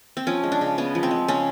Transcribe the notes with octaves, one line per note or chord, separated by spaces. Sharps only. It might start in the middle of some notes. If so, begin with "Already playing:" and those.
C4
F3 C#4
G#3
D4
C#3
B3 C#4
F3
C4
G#3
C#3 C#4